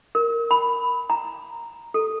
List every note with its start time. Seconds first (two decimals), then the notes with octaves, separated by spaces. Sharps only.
0.15 A#4
0.51 B5
1.10 A#5
1.94 A4